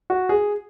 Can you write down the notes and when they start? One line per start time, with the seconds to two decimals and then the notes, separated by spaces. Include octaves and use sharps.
0.10 F#4
0.29 G#4